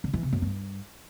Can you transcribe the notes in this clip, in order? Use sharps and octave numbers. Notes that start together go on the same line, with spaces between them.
D3
E3
C3
F#2
G2